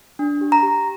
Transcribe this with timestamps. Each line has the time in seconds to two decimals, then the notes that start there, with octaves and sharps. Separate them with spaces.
0.19 D4
0.41 G4
0.52 A#5
0.63 G4